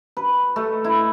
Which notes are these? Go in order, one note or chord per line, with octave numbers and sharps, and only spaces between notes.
B4
A3
E4